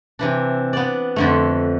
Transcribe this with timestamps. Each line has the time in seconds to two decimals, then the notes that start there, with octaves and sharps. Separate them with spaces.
0.19 C3 E3 D4
0.73 B3 D5
1.16 F2 D3 A3